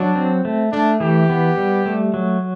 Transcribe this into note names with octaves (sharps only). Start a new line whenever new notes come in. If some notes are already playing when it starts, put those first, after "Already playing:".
Already playing: F#3 D4
C4
A3
A3 D4
E3 G4
B3
G3
A3
F#3